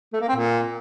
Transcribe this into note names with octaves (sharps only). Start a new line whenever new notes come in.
A3
A#3
C4
A#2